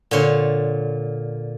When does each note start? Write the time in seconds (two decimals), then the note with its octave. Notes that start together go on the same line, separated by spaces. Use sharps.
0.11 A#2 D3 C#5 C6